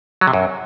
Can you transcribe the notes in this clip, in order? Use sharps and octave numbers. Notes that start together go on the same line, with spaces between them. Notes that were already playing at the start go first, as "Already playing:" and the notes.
F#3
C3
F#2